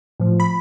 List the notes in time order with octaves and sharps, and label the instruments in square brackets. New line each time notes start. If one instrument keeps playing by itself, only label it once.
[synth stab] A2 F3
B5